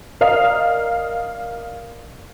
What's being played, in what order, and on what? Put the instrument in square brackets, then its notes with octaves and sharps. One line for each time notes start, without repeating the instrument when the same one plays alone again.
[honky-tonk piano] A#4 D5 D#5 F5 D#6